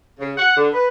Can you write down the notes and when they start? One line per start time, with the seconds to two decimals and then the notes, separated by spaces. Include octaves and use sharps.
0.20 C#3
0.36 F#5
0.56 D3
0.73 B4